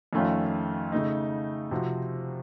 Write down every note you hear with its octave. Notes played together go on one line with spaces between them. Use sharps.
F2 D#3 A3 C#4 F4
C#3 A3 D#4
C3 F3 C4 F#4